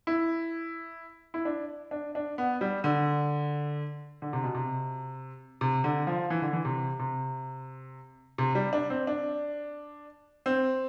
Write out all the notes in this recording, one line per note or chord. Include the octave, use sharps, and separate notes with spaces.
E4
E4
D4
D4
D4
B3
G3
D3
D3
C3
B2
C3
C3
D3
F3
E3
D3
E3
C3
C3
C3
G3
D4
C4
D4
C4